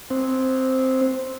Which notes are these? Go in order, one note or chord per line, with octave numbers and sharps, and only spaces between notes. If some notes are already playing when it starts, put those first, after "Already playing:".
C4